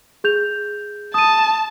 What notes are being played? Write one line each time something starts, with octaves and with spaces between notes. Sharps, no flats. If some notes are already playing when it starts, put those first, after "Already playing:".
G#4 G6 F7
A5 D#6 D#7